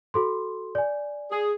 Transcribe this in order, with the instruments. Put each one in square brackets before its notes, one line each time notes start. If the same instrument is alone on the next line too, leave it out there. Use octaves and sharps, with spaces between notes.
[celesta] F#4 A4 C6
D5 G#5
[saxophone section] G#4